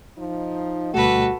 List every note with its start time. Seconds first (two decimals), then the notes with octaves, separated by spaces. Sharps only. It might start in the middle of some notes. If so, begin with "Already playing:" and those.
0.18 F3 D#4
0.94 D2 B2 G3 A3 F#4 A4 B4